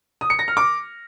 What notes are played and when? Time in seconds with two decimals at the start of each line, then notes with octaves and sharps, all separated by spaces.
0.21 D#6
0.30 C#7
0.39 A#6
0.48 F6
0.57 D6